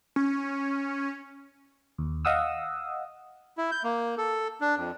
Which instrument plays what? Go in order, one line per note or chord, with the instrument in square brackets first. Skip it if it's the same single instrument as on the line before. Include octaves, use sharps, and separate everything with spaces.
[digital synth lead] C#4
[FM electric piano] D#2
D#5 F5 F#5 D#6 E6
[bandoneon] E4
G6
A#3
A4
D4
F2